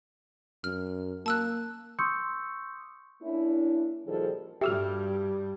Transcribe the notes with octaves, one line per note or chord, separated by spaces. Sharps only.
F#2 F6
A#3 A5 E6 F#6
C6 C#6 D#6 E6 G6 C#7
A#3 C#4 D4 E4
A#2 D#3 F3 G3 G#4 A4
G2 G3 F#4 G4 A4 E5 E6 F6